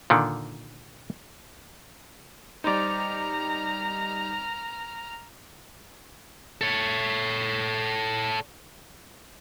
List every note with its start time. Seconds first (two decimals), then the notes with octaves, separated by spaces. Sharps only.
0.10 A#2 D3 D#3
2.64 G3 D#4 C5 D5 A#5 F6
6.61 A4 C#5